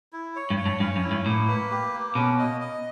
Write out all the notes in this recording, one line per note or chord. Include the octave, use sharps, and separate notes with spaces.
E4
C#5
G2
C#5
G2
G2 C#4
F#2
E4
G2
A2 A#3
B4
G4
A#3
B2 C#4
D#5
D#5